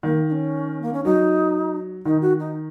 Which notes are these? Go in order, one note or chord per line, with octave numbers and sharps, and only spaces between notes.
D#3 A#3
D#4
C#4
A#3
C#4
F#3 D#4
D#3 D#4
F#4
D#4